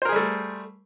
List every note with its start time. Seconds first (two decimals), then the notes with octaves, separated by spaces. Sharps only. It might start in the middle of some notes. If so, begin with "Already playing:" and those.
0.02 C5
0.05 A#4
0.09 G#4
0.12 G3
0.16 A3